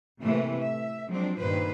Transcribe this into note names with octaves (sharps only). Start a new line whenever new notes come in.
A2 C3 E3 A3 A#3
E5
F3 F#3 G#3 C4 D4
G2 A#2 D#3 A#3 B4 C5